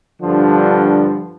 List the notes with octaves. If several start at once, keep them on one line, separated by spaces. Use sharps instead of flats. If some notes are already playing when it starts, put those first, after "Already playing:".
G2 D3 F3